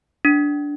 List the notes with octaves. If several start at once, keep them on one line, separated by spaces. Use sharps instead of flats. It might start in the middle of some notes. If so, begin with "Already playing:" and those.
D4